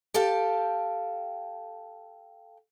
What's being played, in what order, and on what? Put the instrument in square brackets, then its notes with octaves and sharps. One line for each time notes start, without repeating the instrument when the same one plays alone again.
[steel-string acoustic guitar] G4 A4 F5 G5